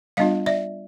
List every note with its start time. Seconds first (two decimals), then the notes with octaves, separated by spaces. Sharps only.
0.17 G3 B3 D4 F4 D#5 F5
0.46 D5 E5